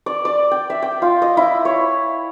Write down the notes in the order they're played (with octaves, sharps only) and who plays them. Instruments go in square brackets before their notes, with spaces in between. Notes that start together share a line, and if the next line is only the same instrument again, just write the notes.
[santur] D5
D5
G5
E5
G5
F4
D#5
E4
C#5